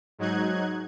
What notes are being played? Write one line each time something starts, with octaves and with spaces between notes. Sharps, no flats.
G#2 F#3 D#4 F#6 G#6